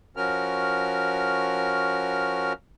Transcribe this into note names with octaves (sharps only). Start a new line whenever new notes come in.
F3 C#4 F#4 A#4 F6